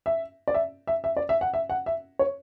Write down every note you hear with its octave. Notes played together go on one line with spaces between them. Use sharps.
E5
D5
E5
E5
E5
D5
E5
F#5
E5
F#5
E5
C#5